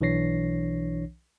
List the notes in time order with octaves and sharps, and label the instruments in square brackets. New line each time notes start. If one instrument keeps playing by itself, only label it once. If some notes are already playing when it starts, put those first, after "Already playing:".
[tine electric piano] B1 E3 D4 C#5 A#6 C7